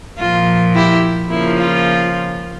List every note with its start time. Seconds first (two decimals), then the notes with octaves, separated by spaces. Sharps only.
0.19 A#2 F3 A#3 F4
0.75 E4 G4
1.31 C#3 F3 A#3 E4
1.59 F4